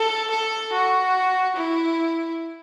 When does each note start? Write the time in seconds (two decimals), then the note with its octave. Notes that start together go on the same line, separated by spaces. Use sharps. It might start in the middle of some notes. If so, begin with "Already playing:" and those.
Already playing: A4
0.31 A4
0.72 F#4
1.56 E4